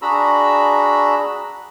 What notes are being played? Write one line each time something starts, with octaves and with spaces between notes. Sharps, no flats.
D4 F#4 G#4 A#5 B5 E6